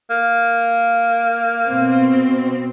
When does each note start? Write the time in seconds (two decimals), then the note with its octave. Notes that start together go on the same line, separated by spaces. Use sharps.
0.10 A#3
1.67 B2 C4